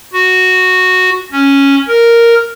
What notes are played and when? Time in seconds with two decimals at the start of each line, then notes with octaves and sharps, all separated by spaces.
0.13 F#4
1.32 C#4
1.88 A#4